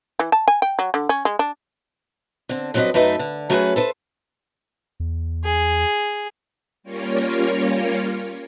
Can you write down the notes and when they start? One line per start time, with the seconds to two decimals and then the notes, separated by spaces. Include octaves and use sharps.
0.19 E3
0.32 A5
0.48 G#5
0.62 G5
0.79 F#3
0.94 D3
1.09 C#4
1.25 G#3
1.39 D4
2.49 D3 C4
2.74 G2 F#3 C4 D4 B4 D#5
2.94 F#2 A3 D#4 B4 E5
3.19 D3
3.50 F#3 A3 B3 C#4 G#4 B4
3.76 A4 B4 C5
5.00 E2
5.45 G#4
6.83 G3 A#3 C#4 F4 A#4 C#5